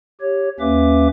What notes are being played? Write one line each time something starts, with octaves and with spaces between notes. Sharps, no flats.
G4 C#5
D#2 A#3 C#4 B4 E5 D6